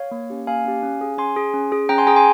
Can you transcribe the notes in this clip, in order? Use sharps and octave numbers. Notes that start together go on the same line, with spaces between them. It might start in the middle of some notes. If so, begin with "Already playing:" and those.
Already playing: C#5 F5
A#3
C#4 G4
A#3 F5 G#5
C#4 G4
C#4
G#4
C#4 G#5 C6
G#4
C#4
G#4
C#4 G5 A#5
G#5 C6
G#4 G5 A#5
G#5 C6